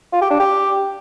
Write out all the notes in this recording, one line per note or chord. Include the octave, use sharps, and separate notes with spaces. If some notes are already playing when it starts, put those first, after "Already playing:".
F4
G4
D4
G4